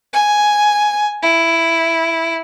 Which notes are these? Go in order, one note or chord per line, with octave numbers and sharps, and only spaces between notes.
G#5
E4